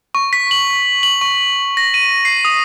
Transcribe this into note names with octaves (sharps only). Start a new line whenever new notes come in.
C#6
B6
F#7
F#7
C#6
A#6
D#7
C7
D#6